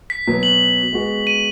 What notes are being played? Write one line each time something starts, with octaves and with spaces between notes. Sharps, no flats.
B6
B2 F#3 B3
F#7
G#3 B3 F#4
D#7